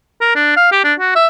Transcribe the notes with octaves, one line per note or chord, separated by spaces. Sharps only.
A#4
D4
F5
G4
D4
F#4
E5